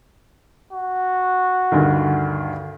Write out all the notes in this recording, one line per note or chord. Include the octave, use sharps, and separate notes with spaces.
F#4
D2 G2 D#3